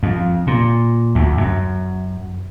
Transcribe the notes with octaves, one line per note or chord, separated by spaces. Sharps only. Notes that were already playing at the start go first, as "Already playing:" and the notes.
F2
A#2
D2
F#2